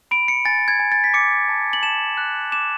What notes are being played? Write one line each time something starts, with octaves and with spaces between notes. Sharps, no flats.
B5 D7
C#7
G#5 A6
G#6
G#5
A6
B6
D6 C#7
A5
F#7
A5 E7
F#6
D6 E7